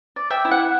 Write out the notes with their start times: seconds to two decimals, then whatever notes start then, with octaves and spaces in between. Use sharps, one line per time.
0.16 D5
0.30 E5 G5
0.45 E4
0.51 F#5